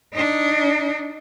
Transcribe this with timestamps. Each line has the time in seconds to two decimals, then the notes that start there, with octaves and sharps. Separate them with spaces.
0.13 D4 D#4